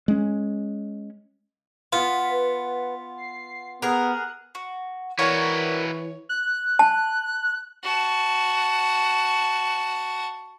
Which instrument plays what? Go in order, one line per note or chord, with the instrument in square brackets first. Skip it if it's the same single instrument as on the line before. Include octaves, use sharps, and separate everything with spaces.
[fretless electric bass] G#3 C#4
[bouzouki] B3 [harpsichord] F4 [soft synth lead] F5
[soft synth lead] B4
C7
[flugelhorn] B3 [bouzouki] G#4 A#4 [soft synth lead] F#6
[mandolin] F#4
[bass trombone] E3 [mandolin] A#3 A#4 D5 [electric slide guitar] E4 F#4 B4 [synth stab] C#5
[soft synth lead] F#6
[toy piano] A5
[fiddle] F#4 A5